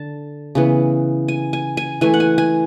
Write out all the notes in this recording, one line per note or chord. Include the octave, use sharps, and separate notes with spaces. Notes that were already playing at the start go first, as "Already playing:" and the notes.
Already playing: D3 A5
C#3 E3 B3
G#5
G#5
G#5
E3 A3 G#5
F#5
G#5
G#5